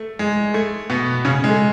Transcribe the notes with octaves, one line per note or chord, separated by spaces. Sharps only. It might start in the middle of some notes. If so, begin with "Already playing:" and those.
Already playing: A3
G#3
A3
B2 B3
C#3 C#4
G#3
A3